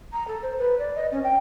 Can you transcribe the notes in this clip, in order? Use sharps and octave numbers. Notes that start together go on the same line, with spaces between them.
A#5
A4
C5
B4
D5
D#5
C#4
G5